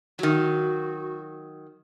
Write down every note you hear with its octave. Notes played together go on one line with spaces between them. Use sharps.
D#3 F#3 F#4